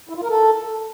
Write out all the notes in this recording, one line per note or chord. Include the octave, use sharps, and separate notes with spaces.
E4
F4
A#4
A4